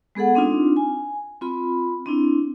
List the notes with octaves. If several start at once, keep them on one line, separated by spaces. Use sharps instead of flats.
G#3 B3 G#4 A4 F#5
C4 D4 D#4 F4
G#5
C4 F4 B5
C4 D4 E4